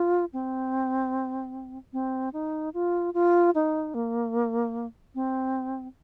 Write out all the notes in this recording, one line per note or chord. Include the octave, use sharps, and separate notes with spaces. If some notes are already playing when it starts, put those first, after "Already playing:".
Already playing: F4
C4
C4
D#4
F4
F4
D#4
A#3
C4